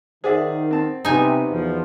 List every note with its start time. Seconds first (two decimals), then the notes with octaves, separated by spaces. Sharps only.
0.24 D#3 G#4 C5 D5 E5 F#5
0.71 C4 A5
1.05 C3 G3 B3 D#4 G#5
1.50 E2 B2 F3